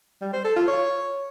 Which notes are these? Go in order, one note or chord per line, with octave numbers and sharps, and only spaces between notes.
G3
C5
A4
F4
C#5